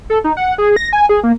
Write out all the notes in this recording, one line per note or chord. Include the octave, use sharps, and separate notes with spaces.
A4
D#4
F#5
G#4
A#6
G#5
G#4
A#3